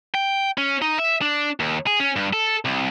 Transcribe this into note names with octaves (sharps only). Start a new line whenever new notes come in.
G5
C#4
D#4
E5
D4
D#2
G#4
C#4
G2
A4
C2